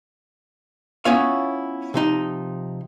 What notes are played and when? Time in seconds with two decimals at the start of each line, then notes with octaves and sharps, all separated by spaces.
1.05 B3 C#4 E4 F4 C#5 F5
1.94 C3 F3 D#4